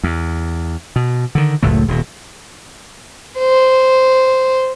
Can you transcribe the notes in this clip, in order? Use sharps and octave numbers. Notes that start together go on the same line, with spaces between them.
E2
B2
D3 D#3
F#1 C#2 A2 A3
D#1 B2
C5